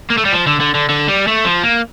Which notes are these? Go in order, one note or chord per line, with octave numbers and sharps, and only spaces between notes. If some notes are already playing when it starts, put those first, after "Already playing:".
A#3
A3
G3
F3
D3
D3
D3
D3
G3
A3
F3
A#3